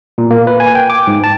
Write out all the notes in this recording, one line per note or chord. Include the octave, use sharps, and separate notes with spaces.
A#2
A#3
B4
G#5
G5
D6
G#2
A5